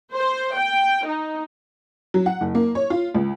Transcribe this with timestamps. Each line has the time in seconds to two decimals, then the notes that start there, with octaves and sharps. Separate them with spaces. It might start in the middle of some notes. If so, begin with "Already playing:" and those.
0.14 C5
0.56 G5
1.07 D#4
2.14 F#3
2.26 F#5
2.41 F#1
2.55 A#3
2.75 C#5
2.90 F4
3.15 C#2